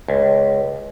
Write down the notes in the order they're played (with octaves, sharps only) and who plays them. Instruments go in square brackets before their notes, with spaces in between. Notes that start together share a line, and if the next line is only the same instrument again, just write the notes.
[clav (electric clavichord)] C#2